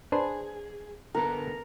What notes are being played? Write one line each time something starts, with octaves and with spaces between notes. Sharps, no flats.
D4 G#4 B4 C5
D3 B3 A4 A#4